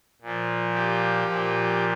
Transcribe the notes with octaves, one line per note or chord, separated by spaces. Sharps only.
A#2 F3
G4
A#2 F3